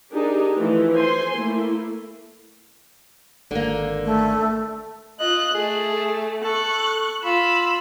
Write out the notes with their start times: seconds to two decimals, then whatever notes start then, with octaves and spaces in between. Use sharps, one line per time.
0.13 D4 D#4 G4 G#4 A#4
0.57 E3 F3 A3
0.94 C5 G#5 C6
1.35 A3 A#3 E4
3.51 G#1 D3 A#3
4.05 A3
5.20 F4 D#5 F#6
5.55 A3 G#4
6.44 A4 C#6 F#6
7.24 F4 B5 E6